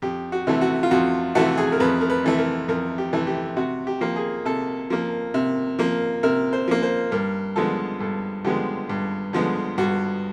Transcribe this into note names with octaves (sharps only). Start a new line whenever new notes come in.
F2 G4
F#4
C3 E3 A3
F#4
F4
F2 F#4
C3 E3 A3 F#4
G#4
A#4
F2 B4
A#4
B4
C3 E3 A3
A#4
F2 A#4
G4
C3 E3 A3
G4
C3 F#4
G4
F3 A#3
G#4
C3 A4
F3 A#3
C3
F3 A#3
C3 A#4
C5
F3 A#3
C5
G2 A#4
D3 F3 G#3 B3 A4
G2 A4
D3 F3 G#3 B3 G4
G2
D3 F3 G#3 B3
G2 F#4